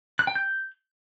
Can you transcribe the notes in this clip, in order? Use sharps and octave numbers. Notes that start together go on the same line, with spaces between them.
F#6
G5
G6